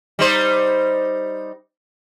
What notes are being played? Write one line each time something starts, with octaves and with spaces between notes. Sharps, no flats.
G3 D#4 C5